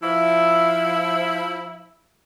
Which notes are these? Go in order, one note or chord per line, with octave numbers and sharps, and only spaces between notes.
F3 E4